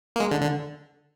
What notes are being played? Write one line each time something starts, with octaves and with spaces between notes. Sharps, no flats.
A#3
G#3
D3
D3